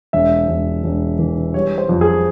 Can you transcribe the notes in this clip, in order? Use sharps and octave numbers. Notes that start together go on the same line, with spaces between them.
E1 E5
E1
E1
E3
G3 C#5
C5
F2
G#4